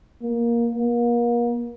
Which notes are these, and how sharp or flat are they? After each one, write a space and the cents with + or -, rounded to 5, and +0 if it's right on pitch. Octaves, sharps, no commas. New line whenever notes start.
A#3 +15
A#3 +35